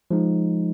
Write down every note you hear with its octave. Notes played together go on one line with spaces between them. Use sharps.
F3 G#3 D#4